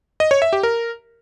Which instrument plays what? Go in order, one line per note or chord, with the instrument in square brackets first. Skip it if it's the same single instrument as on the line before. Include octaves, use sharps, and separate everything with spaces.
[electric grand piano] D#5
C#5
E5
G4
A#4